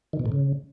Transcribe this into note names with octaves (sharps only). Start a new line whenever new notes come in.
D#3
B2
A2
C#3